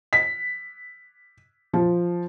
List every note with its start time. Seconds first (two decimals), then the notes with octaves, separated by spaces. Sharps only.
0.13 B6
1.73 F3